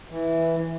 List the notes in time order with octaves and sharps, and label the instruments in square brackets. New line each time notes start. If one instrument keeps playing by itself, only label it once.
[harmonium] E3